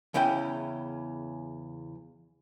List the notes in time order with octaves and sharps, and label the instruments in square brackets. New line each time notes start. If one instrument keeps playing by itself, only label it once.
[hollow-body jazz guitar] E2 C#3 C#4 E4 G5